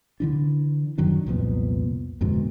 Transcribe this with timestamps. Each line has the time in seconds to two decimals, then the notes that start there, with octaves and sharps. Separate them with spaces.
0.20 D3 E3 D4
0.98 F#2 D#3 F#3 D4
1.26 C2 F2 A#2 B3
2.21 F2 G#2 B2 D3